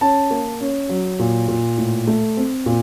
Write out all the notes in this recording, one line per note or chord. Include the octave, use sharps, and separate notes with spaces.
C#4 A5
A#3
C#4
F#3
A#2
A#2
A2
A3
C4
A#2